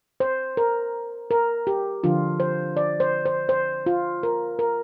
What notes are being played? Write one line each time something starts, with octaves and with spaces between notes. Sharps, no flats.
C5
A#4
A#4
G4
D3 F3 D4 F4
C5
D5
C5
C5
C5
F4
A#4
A#4